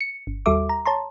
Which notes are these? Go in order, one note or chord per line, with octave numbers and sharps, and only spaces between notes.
C#7
G1
D#2 G3 F#4 A4 E5 D6
A#5
C#5 A5 A#5 C6